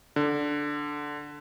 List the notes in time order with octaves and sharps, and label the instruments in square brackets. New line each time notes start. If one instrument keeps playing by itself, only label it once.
[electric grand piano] D3